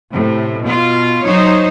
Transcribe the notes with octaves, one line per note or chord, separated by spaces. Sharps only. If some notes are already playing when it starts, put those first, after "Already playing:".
A2 C3
B2 F4
F#3 D#4 C5 C#5